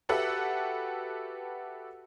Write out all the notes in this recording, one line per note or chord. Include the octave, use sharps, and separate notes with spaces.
F#4 G4 A4 B4 E5 F#5